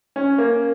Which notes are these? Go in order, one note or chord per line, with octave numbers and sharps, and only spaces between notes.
C#4
A#3